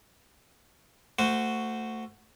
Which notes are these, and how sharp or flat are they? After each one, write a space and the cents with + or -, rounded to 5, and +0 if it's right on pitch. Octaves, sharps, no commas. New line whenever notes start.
A3 +20 F#4 +0 C5 -15